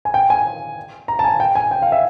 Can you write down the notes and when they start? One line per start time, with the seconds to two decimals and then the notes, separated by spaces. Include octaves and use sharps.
0.05 G#5
0.14 G5
0.30 G#5
1.08 A#5
1.19 A5
1.24 G#5
1.40 G5
1.55 G#5
1.71 G5
1.82 F5
1.92 E5